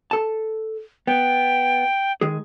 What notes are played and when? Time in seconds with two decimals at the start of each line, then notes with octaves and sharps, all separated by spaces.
0.11 A4 A5
1.07 B3 G5
2.21 D#3 G#3 G#4